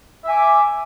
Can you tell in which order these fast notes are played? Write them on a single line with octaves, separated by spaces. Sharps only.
E5 G#5 D6